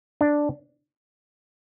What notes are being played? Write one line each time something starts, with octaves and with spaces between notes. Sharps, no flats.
D4